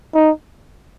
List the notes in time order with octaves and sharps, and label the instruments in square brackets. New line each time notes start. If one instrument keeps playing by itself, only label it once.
[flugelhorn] D#4